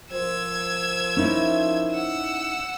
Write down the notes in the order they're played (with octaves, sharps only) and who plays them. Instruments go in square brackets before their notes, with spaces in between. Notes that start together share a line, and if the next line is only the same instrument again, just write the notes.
[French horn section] F3 A#4 C5 [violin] E6 G#6
[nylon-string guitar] C#4 D#4 E4
[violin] F#5 E6